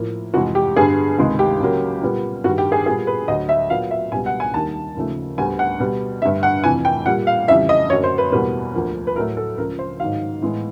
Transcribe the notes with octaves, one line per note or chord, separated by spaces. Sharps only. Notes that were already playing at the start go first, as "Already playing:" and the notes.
Already playing: A2 F3 A#3
F2 C3 E3 G#3 F#4
G4
G2 D3 G3 B3 G#4
C#2 C3 D#3 G#3
G4
C#2 C#3 F#3 A#3
A#2 G3 B3
G2 D#3 G3 F#4
G4
G#4
A#2 G3 B3 G#4
B4
D2 D3 F#3 D#5
E5
A#2 F#3 B3 F5
E5
C#2 B2 G3 B3 G#5
F#5
G#5
D#2 D#3 G3 A#3 A5
D#2 C#3 F3 A3
D2 D3 G3 B3 G#5
F#5
B2 G3 B3
G2 D3 G3 E5
F#5
F2 C3 E3 G#5
G5
A#2 G3 A#3 F#5
F5
F2 C#3 E3 G3 E5
D#5
F#2 D3 F#3 A#3 C#5
C5
B4
E2 B2 G3 A#3 B4
D2 D3 F3 A#3
B4
A2 F#3 A3 A#4
A4
C#2 C#3 F3 A#4
C5
G#2 D#3 F#3 F5
A2 E3 G#3 B3